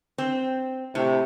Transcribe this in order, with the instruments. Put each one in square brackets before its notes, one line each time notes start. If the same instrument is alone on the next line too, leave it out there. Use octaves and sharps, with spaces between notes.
[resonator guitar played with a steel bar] C4
[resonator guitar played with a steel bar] A2 [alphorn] C3